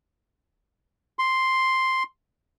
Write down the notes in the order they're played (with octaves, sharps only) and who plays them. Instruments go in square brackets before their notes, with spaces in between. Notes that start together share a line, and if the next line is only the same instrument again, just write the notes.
[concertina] C6